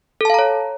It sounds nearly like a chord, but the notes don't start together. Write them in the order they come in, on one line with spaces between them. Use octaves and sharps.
A4 A5 F5 A#5 C#5